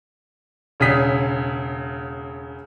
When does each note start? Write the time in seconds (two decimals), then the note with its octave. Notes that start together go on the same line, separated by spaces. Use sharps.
0.80 E1 C#3 D#6 B6